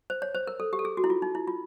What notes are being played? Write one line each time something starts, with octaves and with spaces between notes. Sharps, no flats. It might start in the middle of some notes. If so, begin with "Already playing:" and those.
C5
C#5
C5
A#4
A4
G4
A4
G#4
F#4
E4
F4
D#4
E4
F4